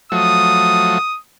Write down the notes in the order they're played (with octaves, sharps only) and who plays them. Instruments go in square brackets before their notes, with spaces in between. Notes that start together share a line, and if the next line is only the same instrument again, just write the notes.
[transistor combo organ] F3 F#3 A3 [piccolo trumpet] D#6